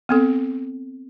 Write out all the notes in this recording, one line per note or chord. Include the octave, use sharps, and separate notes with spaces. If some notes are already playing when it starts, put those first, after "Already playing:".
B3 C4 A4